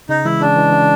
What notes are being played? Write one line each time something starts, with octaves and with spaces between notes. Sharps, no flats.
C#3 D#4
E3 G#3 E4
C#3 D4
E3 G#3
C#3